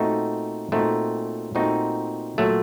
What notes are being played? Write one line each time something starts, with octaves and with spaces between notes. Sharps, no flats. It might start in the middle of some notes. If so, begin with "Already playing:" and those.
Already playing: A#2 A3 C4 D#4 F#4
A#2 A3 C4 D#4 F#4
A#2 A3 C4 D#4 F#4
A#2 F#3 A3